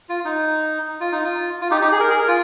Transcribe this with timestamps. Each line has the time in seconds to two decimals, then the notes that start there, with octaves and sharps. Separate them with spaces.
0.09 F4
0.25 D#4
1.00 F4
1.12 D#4
1.24 F4
1.61 F4
1.71 D#4 G4
1.81 D#4 G4
1.92 G#4
2.00 A#4
2.10 G#4
2.19 A#4
2.28 F4